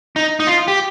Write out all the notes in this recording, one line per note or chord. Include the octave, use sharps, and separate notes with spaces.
D#4
D#4
F4
G4